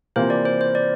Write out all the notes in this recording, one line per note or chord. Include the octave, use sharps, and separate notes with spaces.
C3 E3 A#3 F4 C5
D5
C5
C5
D5